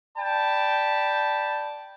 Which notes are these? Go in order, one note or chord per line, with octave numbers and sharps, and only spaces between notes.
D5 G5 A5 B5